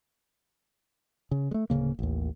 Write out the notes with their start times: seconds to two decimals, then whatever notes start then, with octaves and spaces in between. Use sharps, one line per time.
1.31 C#3
1.51 G#3 A3
1.70 D1 C#2 C#3 A#3
1.99 A1 D#2